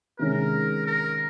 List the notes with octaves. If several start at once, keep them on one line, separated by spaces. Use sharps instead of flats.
C3 D#3 G#3 C#4 A#4
A#4